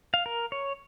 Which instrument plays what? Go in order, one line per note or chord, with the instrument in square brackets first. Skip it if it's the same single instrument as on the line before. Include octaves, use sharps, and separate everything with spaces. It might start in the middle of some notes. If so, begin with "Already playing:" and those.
[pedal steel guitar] F5
A#4
C#5